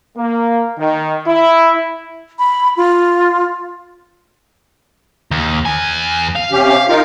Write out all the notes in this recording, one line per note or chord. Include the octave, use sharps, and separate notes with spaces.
A#3
D#3
E4
B5
F4
D#2
E2 G#5
F5
C3 C#4 G4
D#4 F4 A#4